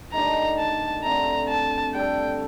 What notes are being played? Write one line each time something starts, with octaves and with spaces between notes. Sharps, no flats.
D#3 A3 D4 G4 A#5
A5
D3 A3 C4 A#5
A5
G3 D4 A4 G5